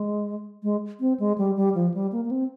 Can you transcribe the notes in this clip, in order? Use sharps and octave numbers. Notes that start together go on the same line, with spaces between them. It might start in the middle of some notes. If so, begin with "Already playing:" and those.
Already playing: G#3
G#3
C4
G#3
G3
G3
F3
G3
A#3
A#3
C4